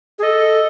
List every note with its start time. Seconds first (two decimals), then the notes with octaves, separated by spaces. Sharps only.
0.19 G#4
0.23 A4 D#5